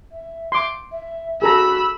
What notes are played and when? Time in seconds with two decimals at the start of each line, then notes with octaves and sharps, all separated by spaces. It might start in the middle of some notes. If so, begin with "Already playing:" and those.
0.12 E5
0.52 C6 D6
0.92 E5
1.42 F#4 G#4 A4 A#5 B5 E6